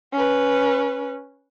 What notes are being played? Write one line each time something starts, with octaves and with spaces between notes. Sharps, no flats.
C#4 B4